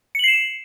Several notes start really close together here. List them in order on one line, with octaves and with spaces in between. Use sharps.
C#7 F#7 C7 E7